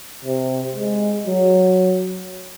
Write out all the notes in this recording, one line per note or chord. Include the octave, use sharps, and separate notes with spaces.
C3
G#3
F#3